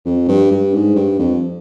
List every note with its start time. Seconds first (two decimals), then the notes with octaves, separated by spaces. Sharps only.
0.05 F2
0.28 G2
0.51 G2
0.74 G#2
0.96 G2
1.19 F2